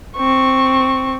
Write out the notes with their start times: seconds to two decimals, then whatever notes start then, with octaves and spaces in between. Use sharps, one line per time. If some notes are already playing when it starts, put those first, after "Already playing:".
0.16 C4 C#6